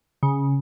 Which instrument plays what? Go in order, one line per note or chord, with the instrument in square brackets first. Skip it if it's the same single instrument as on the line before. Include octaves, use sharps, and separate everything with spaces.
[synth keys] C#3